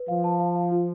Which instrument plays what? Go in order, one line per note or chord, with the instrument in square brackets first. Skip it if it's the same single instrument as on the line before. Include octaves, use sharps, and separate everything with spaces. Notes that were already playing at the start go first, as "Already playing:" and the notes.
Already playing: [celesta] B4
[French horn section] F3 [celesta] F5
[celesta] A5
F5
F5
F4